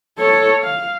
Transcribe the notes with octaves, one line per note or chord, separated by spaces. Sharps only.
A4 C#5
F5